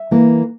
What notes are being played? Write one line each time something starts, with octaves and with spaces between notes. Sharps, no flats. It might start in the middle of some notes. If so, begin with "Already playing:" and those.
Already playing: E5
E3 A#3